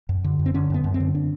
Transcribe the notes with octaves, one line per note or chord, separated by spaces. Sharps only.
F#2
D3
F#2
C4
D3 C#4
F#2 B3
F#2
C4
D3
D4